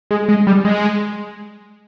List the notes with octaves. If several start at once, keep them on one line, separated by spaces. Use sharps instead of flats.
G#3
G#3
G3
G#3